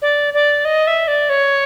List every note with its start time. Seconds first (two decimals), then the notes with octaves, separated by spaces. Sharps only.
0.02 D5
0.34 D5
0.65 D#5
0.87 E5
1.08 D5
1.30 C#5